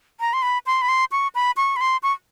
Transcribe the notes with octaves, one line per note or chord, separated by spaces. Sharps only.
A#5
C6
B5
C6
B5
C6
C#6
B5
C#6
B5
C6
C#6